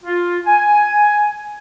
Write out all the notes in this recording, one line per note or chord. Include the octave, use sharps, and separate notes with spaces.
F4
G#5